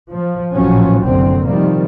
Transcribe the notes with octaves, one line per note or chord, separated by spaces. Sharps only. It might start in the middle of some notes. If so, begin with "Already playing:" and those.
F3
A1 A#2 F3 F#3 C#4
F#1 C2 F#2 D3 C4
C3 D#3 F3 G3 A#3